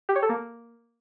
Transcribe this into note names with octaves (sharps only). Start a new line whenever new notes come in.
G4
C#5
A4
A#3